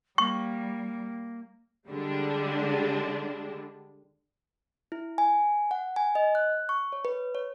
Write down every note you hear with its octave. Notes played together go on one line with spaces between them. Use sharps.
G3 A#3 C#6
D3 G3 G#3 D4
E4
G#5
F#5
G#5
D#5
F#6
C#6
C#5
B4
C#5